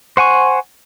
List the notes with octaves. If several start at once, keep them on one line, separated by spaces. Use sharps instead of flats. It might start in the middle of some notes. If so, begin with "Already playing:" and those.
C5 F#5 G#5 C#6